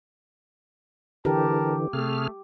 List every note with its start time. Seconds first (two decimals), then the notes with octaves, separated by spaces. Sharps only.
1.25 D3 E3 G4 A#4 A5
1.93 C3 A3 G#4 F6